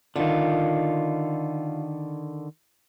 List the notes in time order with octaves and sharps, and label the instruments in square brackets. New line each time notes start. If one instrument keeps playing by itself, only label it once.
[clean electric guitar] D3 D#3 [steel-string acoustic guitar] F4